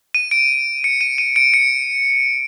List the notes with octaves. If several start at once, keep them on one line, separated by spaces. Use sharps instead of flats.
D#7
D7
C#7
D#7
D#7
D7
C#7